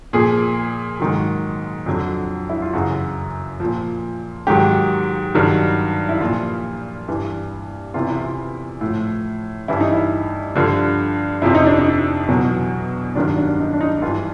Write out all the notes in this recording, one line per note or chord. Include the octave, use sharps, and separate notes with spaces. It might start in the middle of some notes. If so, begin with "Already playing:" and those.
A#2 F3 G#4
G#2 D#3 F#3
F2 D3 F#3
E4
F4
F#2 C#3 E3 F#4
A#2 F3
G#2 D#3 F#3 G4
G2 D#3 F#3
E4
A#2 F3 F4
G2 E3
E2 C3 E3 F4
E4
F4
A2 F3
G2 E3 E4
D#4
E4
G2 D3 F3
F2 C3 F3 E4
D#4
D4
D#4
E2 B2 F#3
G2 D#3 F#3 D4
D4
D#4
D4
D#4
G2 E3 F4